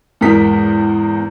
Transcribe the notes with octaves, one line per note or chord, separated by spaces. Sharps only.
E2 G#2 A#4 B6